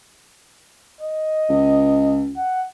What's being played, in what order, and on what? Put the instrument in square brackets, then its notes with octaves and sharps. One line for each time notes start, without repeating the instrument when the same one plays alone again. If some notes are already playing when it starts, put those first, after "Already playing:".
[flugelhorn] D#5
[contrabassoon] C#2
[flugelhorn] F#5